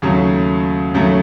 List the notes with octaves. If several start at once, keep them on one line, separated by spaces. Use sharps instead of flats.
D#2 C#3 F#3 A3
D#2 C#3 F#3 A3